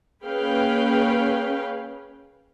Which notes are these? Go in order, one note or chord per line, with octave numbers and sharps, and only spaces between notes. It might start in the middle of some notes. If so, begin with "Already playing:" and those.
A#3 C#4 G#4 B4 F5 G5